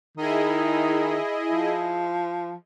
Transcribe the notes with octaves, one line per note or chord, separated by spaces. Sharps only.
D#3 E4 G#4 D#5
F3